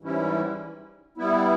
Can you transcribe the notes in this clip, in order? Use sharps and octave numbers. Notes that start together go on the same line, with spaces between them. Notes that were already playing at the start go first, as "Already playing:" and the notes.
G#2 E3 G3 C#4 E4
G3 B3 E4